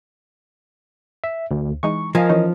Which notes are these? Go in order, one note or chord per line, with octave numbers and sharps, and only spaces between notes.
E5
D2
E3 G#3 D#4 C#6
F3 A#4 D#5 F5 G#5
E3 C#4 D#4